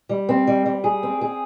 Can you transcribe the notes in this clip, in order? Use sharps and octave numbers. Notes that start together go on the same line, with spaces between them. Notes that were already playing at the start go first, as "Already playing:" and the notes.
G3
C4
G3
G3
G#4
C4
G#4